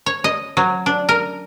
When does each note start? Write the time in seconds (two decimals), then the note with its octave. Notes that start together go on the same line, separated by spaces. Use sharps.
0.06 C#5
0.24 D#5
0.57 F#3
0.86 D4
1.09 A#4